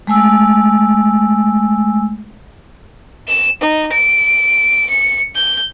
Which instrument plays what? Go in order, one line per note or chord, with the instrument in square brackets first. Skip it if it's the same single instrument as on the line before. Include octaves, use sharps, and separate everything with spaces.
[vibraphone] G#3 A3 G#5 E6
[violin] E7
D#4
D7
C#7
G6